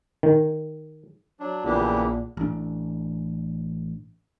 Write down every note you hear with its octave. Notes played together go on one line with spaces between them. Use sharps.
D#3
F#3 D4
A#1 C#3 E3 A#3 B3 D4 G4
A1 D4